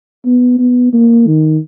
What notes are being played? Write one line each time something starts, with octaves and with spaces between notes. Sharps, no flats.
B3
B3
A#3
D#3